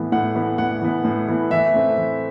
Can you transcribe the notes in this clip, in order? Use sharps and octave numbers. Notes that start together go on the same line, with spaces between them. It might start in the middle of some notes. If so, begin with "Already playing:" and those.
Already playing: A2 E3 B3
A2 F#5
E3 B3
A2 F#5
E3 B3
A2
E3 B3
E3 E5
A3 C4
E3